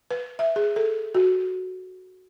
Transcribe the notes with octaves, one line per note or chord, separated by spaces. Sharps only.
B4
E5
G#4
A4
F#4